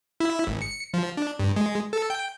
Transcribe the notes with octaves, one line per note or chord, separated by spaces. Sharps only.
E4
G#1
C#7
F3
D4
G2
G#3
A4
G5